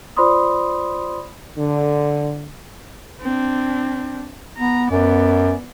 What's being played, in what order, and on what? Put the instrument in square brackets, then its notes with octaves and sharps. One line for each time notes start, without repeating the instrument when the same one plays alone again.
[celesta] F4 C5 D5 B5 C6 D#6
[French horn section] D3
[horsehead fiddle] C4 D4
[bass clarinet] B3 [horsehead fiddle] A#5
[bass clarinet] F#2 [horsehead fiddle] B3 D5